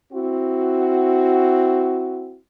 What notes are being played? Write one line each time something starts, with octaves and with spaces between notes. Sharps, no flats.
C4 E4 F#4